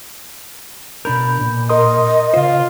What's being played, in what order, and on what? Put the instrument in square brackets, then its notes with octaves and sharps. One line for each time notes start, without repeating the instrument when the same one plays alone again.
[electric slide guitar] B2 D4 A#4 [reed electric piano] B5 G6
[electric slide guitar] A#2
[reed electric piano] A#4 C6 D#6 [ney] D#5
[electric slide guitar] C#3 C5 [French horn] F4